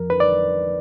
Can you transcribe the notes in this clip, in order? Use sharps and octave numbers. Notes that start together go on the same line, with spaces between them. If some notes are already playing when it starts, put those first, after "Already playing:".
Already playing: F2 F3 A#4
B4
D5